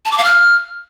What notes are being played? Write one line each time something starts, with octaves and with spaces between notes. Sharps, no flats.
A5
D6
F5
F6